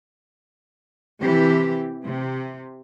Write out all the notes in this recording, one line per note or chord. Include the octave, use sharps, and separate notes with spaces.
C3 E3 G4
C3